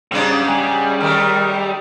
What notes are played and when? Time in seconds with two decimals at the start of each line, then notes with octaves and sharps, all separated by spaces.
0.12 G#2 C#3 G3 D4
0.49 G3 G#5
1.01 D#3 A3 A#4